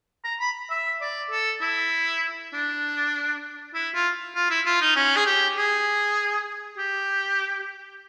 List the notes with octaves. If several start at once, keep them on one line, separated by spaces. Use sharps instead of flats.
A#5
B5
E5
D5
A4
E4
D4
E4
F4
F4
E4
F4
D#4
C#4
G#4
G4
G#4
G4